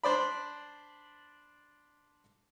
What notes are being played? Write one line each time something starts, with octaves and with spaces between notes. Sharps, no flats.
D4 C5 D5 B5